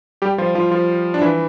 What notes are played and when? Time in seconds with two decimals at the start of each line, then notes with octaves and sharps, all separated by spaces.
0.22 G3 G4
0.38 F3 F4
0.55 F3 F4
0.71 F3 F4
1.14 D4
1.22 E3 E4